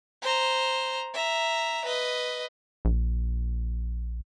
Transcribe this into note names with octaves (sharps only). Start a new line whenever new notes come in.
C5 A#5
E5 A#5
B4 D#5
A#1